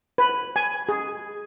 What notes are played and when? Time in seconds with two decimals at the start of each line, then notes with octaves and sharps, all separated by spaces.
0.18 B4
0.56 G#5
0.89 G#4